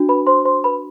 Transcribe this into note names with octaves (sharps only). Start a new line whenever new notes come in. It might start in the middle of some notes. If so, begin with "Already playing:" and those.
Already playing: D4 F#4
B4 B5
C5 C6
C5 C6
B4 B5